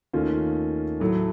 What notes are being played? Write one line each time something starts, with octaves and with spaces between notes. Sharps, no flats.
D#2 D#3 A3 C#4 F4
A2 F#3 A3